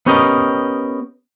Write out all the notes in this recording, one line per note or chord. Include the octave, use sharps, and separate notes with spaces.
B3 C#4 G4 A#4 D#5